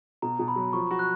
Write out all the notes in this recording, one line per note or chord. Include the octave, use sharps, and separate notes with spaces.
B2 A#5
B2
B5
F#3
F3 C#6
F#4
F#6